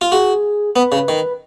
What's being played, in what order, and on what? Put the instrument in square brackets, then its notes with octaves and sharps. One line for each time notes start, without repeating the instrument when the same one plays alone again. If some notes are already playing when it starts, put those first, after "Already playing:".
[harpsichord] F4
[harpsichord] F#4 [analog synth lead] G#4
[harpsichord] B3 [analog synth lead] B4
[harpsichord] C#3
D#3